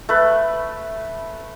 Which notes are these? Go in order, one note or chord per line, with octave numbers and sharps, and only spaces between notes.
A3 B4